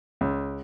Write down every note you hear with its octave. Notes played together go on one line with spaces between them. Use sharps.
C#2